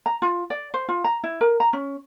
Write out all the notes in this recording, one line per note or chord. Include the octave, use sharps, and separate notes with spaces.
A#5
F4
D5
C5
F4
A#5
E4
A#4
A#5
C#4